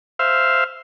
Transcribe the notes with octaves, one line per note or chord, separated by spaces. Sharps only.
C5 E5 F5